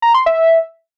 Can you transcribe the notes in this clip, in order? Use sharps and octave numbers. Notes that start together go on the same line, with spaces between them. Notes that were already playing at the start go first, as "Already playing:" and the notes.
A#5
C6
E5